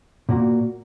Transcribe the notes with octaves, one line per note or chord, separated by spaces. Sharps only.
A#2 A#3 F#4